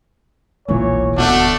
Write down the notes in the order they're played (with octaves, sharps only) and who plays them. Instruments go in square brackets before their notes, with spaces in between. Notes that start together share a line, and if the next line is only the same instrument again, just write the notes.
[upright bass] E1 B1 [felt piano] A#2 E3 [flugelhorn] C#5
[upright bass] D#1 D2 [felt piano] B2 [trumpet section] A3 D4 [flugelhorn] F#4